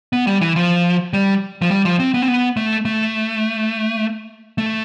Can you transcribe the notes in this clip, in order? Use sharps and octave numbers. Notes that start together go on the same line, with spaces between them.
B3
G3
E3
F3
G3
F3
G3
F3
C4
B3
C4
B3
A3
A3
A3